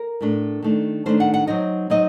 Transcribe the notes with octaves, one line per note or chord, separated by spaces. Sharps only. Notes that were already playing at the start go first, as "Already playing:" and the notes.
Already playing: A#4
A2 A3 D4
D#3 A3 D4
D#3 A3 D4 C5
F#5
F#5
F#3 C4 D#4 D#5
F#3 C4 D#4 D#5